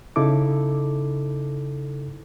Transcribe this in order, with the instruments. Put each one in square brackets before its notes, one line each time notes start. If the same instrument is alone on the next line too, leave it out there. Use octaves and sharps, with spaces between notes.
[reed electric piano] C#3 D#4 E4 A4 D6